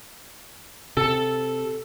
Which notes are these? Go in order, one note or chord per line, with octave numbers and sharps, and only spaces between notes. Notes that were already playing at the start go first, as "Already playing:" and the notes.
C3 A4